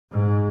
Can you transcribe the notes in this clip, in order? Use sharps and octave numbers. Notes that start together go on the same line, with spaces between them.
G#2